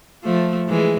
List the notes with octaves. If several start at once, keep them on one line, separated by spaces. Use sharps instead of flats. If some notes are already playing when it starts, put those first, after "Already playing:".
F3 A3
E3 G#3